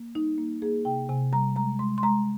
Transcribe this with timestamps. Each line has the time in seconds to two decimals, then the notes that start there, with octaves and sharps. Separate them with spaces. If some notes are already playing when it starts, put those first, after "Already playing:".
Already playing: A#3
0.15 G3 D#4
0.38 A#3
0.62 A#3 G#4
0.85 C3 G5
1.09 C3 G#5
1.33 G3 A#5
1.56 G#3 A#5
1.79 G#3 C6
1.98 C6
2.03 G#3 A#5